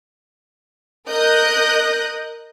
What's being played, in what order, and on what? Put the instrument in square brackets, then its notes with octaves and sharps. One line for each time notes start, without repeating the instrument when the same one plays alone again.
[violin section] A#4 D#5 D#6 F#6 G6